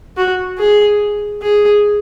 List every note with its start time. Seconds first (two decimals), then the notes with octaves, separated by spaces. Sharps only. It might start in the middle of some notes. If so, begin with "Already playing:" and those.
0.17 F#4
0.58 G#4
1.43 G#4